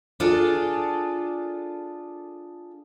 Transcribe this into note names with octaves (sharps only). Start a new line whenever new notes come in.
D4 F4 G#4 A4 D5